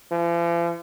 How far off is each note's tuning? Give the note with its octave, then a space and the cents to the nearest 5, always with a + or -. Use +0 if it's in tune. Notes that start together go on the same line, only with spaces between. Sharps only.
F3 -45